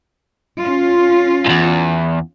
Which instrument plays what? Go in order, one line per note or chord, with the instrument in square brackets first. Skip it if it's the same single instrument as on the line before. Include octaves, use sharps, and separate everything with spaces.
[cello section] C#4 F4
[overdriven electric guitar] E2 G#2